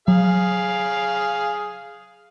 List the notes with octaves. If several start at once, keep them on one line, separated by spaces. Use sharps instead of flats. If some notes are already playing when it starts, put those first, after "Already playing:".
F#3 G#4 F5